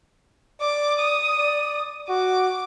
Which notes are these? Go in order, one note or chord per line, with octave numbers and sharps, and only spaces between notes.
D5 D6
D#6
D5
F#4 D6